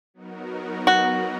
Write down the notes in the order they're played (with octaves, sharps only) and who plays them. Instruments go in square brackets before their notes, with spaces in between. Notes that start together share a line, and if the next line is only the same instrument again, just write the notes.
[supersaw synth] F#3 B3 D#4 F#4 A#4
[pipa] F#4